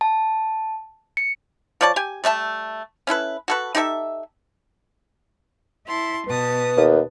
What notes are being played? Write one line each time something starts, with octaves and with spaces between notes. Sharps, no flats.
A5
C#7
F3 C#5 D5 A5
G4 G#5
G3 A3 E5 A5
C#4 E4 A4 B4
F#4 A4 B4
D#4 G4 A4 E5
E4 A5 C6
B2 B4 A5 D#6
D#2